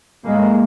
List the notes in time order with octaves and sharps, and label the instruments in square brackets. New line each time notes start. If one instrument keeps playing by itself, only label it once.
[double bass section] A2 G#3 A#3